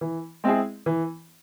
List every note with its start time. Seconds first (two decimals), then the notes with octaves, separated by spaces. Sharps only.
0.01 E3
0.44 G#3 C4 E4 G#4
0.86 E3